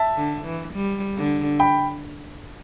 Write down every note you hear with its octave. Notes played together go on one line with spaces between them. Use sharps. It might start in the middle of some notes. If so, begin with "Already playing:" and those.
Already playing: E5 A5
D3
E3
G3
D3
G5 B5